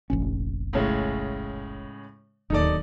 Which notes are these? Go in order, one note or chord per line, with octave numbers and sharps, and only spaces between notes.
F1 A#1 C#4
A2 C#3 G#3
D1 D#2 D#4 A4 D5